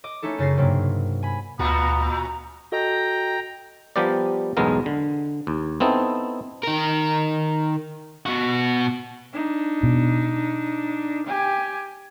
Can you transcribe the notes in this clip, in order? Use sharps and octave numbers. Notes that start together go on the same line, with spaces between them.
D#5 D6
A3 C#4 D#4 E4 A4
F#2 C#3 A6 A#6 C7
G2 C3 F#3 A#3
G#5 B5
D2 A#2 B3 F4 F#4 A#5
F#4 A4 D#5 G5 A#5
F3 G3 B3 G4 A#4 D5
B1 E2 A2 G#3 B3 A#4
D3
D#2
B3 C4 D#4 E4 A4
D#3 A#4
B2 F#4
D4 D#4
B2
G4 G#5